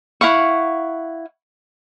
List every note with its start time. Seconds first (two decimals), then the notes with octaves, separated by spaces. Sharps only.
0.21 E4 F5 F#5 C#6